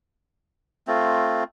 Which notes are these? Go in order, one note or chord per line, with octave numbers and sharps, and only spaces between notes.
A3 C4 F4